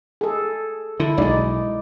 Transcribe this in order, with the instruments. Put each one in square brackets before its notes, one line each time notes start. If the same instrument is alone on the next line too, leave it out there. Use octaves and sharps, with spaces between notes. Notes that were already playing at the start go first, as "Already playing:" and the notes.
[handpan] G#4 A4
[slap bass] D3 [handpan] E4
[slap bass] B1 G#3 [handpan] D#4 D5